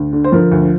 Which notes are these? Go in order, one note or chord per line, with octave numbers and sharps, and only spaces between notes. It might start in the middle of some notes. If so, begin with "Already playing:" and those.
Already playing: D2
D3
C5
F3 A#4
D2